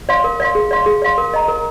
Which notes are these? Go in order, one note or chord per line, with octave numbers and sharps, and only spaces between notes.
D5 F5 C6
A#4
D5 F5 C6
G#4
D5 F5 C6
G#4
D5 F5 C6
A#4
D#5 A#5
A#4